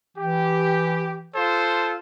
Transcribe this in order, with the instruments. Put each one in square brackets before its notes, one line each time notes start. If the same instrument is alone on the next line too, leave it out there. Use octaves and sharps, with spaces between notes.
[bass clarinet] E3 [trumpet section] G4
[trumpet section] F4 A4 C5